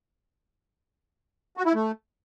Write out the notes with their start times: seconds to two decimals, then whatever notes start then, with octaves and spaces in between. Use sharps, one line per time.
1.57 F#4
1.66 E4
1.75 A3